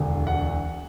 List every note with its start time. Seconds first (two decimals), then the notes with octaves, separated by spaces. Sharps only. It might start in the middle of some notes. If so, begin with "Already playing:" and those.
Already playing: E1 D2 D3
0.27 F#5